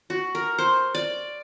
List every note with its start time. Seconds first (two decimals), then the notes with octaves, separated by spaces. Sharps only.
0.10 F#4
0.35 A#4
0.58 C5
0.95 D5